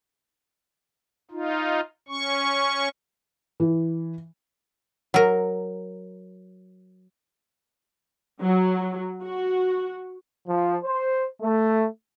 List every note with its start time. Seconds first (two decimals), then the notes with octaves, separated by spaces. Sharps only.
1.31 D#4 F4
2.08 C#4 C#6
3.60 E3
5.14 F#3 A#4
8.40 F#3
9.22 F#4
10.47 F3
10.84 C5
11.42 A3